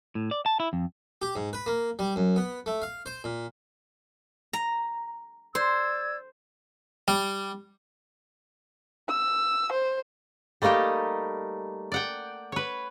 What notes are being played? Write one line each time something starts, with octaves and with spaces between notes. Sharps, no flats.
A2
D5
A5
E4
F2
G4
G#2
B4
A#3
G3
F#2
B3
A3
F5
C5
A#2
A#5
C5 D5 E6 G#6
G3
E6
C5
G3 A3 A#3 D#4 G4
D5 F#5 G5
B4 C#5